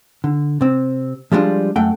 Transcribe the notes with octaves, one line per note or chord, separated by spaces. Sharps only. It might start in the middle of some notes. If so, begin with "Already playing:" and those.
D3
C3 C4
F3 G3 G#3 D4 F4
F#2 A3 F#5 G5